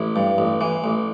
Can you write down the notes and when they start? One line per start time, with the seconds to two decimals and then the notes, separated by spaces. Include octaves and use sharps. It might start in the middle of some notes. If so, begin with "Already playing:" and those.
Already playing: A1 E4
0.16 G2
0.38 A1
0.61 E3
0.84 A1